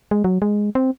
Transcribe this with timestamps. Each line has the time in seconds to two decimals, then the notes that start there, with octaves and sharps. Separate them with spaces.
0.11 G#3
0.24 F#3
0.42 G#3
0.75 C4